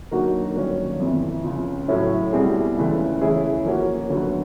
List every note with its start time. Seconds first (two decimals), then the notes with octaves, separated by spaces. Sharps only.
0.11 D3 F#3 A#3 D#4 F#4
0.56 G2 D#3 F#3 A#3 C#4
1.00 F2 C3 E3
1.44 C#2 C#3 F3
1.88 A2 F#3 A3 C#4 E4
2.33 B2 G3 C4 E4 G#4
2.77 C#2 C#3 E3 A3
3.21 E3 A3 C#4 E4 G#4
3.65 F3 A#3 C#4 F#4
4.09 D2 D3 F#3 B3